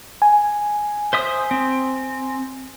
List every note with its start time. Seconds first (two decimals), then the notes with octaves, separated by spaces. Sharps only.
0.22 G#5
1.13 C5 E5 D#6
1.51 C4